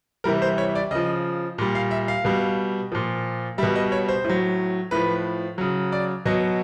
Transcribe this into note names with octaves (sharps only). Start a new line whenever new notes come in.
C3 E3 G3 A#4
C5
C#5
D5
C#3 F3 D#5
A#2 G3
F5
E5
F5
B2 G3
A#2 F3
B2 G3 E5
D#5
C#5
C5
A2
F#3
A2 F3 B4
C#3 F#3
D5
B2 F#3 D#5